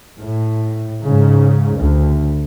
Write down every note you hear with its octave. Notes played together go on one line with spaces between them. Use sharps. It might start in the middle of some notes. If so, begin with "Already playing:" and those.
A2
G#2 C#3
D2